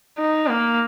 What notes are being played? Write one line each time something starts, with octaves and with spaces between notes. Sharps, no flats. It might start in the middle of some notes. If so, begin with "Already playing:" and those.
D#4
A#3